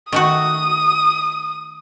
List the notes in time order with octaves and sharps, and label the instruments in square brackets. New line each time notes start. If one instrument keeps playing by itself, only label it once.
[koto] D#3 A3 F#4 [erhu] D#6